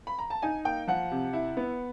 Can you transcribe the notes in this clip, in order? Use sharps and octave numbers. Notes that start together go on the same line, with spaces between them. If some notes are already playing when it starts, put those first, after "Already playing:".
B5
A#5
A5
D#4 G#5
A#3 G5
F3 F#5
C3
E4
B3